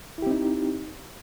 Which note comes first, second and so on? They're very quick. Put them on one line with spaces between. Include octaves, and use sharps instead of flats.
E4 G4 C4 D#4